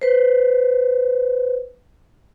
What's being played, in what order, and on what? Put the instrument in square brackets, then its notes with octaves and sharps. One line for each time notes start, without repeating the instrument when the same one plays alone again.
[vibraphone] B4 C5